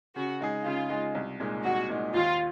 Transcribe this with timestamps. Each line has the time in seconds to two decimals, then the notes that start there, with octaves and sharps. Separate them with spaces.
0.16 C#3 F#4
0.41 G#3 D#4 G#4
0.64 C#3 F4
0.90 G#3 D#4 G#4
1.15 C2
1.40 A#2 G#3 D#4
1.64 C2 F#4
1.89 A#2 G#3 D#4
2.14 D#2 F4